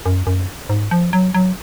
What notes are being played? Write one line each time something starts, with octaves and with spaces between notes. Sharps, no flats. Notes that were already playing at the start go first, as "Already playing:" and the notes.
F#2
F#2
G#2
F3
F#3
F#3